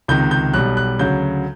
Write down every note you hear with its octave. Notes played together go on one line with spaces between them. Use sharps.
C#2 C3 D#3 G6
G6
B1 B2 G3 F#6
F#6
D2 C#3 F#3 G6